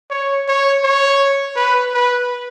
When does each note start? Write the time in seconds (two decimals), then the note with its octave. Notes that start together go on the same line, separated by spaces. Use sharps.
0.10 C#5
0.48 C#5
0.84 C#5
1.56 B4
1.93 B4